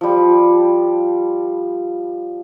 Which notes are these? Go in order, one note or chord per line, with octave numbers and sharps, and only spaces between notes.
F3 G3